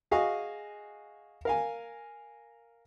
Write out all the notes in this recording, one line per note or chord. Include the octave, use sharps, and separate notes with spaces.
F#4 G#4 D#5 F5 G#5 C#6
A#4 F5 G#5